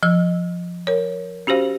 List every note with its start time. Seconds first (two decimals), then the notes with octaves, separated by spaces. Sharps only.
0.03 F3 E6
0.87 A#4 C#5
1.47 C#4 F#4 G4 C5 F5